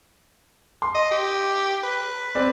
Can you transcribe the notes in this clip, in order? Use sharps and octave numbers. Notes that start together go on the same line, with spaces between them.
C6
D#5
G4
B4
C4 D5